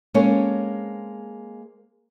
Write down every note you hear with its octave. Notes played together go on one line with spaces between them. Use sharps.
G#3 A#3 C4 C#4 A4 C#5